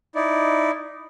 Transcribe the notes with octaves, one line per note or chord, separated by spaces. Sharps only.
D#4 E4 D5